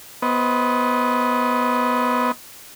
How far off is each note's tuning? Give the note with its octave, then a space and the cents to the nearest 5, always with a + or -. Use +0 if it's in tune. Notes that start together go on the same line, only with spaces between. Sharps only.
B3 +0 C5 +0 D#5 +25